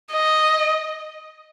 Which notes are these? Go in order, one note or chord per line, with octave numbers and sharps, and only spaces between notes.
D#5